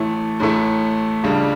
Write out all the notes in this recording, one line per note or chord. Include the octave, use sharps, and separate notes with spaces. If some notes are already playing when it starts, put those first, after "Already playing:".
Already playing: A1 A2 E3 A3 E4
A1 A2 E3 A3 E4
C#2 C#3 G3 D4